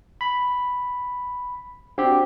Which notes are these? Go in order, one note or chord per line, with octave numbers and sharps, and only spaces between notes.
B5
C4 D4 F#4 G4